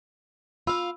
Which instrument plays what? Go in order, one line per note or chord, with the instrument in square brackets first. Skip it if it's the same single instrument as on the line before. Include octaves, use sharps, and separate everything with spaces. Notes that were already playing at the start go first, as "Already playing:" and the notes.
[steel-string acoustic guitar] F4 F5 [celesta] B5 E6